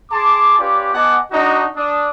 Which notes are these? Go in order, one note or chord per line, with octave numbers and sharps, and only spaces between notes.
G#4 A5 C6 D6
C#4 F4 G4 B4 D5 D6
B3 D#5 F#5 G#5 A5 D6
D4 D#4 F#4
D4 D#6